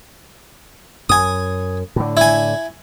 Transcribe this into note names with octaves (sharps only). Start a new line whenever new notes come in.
F#2 G#5 D#6
A2 D3
E4 G#5